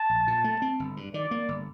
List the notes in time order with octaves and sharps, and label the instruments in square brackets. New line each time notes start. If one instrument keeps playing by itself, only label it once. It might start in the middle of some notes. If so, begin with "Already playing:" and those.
Already playing: [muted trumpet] A5
[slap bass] A#1
A#2
A3
C4
G1
G2
[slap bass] D#3 [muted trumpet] D5
[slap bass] A#3
G1